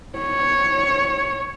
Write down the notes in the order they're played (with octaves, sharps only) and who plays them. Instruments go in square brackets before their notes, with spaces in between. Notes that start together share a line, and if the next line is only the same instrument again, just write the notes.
[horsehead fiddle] C#5